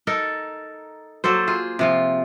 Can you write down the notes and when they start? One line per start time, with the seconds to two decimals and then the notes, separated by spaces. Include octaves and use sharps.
0.07 D#4 A4 A#4
1.24 F#3 A#3 A4 C5
1.47 F4 G#4
1.79 C3 F3 F4